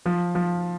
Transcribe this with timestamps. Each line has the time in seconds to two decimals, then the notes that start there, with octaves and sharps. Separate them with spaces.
0.06 F3
0.35 F3